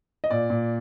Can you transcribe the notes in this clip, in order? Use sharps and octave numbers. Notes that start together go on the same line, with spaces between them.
D#5
A#2 D5
A#2